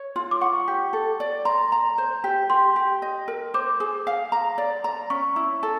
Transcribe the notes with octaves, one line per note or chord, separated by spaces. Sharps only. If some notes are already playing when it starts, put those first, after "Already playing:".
Already playing: C#5
F4
D6
F#5 C#6
G4
A4
D5
A#5 C6
A#5
C5
G4
G4 C6
G4
D#5
A#4
C5 D6
G#4
F5
A#5
D5
A#5
C#4 C#6
E4
A4